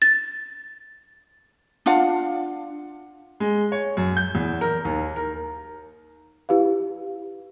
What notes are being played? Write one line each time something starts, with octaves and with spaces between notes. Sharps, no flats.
A6
D4 F4 F5 F#5
G#3
C#5
F#2
G6
E2
A#4
D#2
A#4
E4 G4 B4 F5